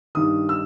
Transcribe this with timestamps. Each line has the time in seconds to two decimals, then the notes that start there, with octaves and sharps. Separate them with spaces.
0.15 G2 D#3 D#6
0.49 E6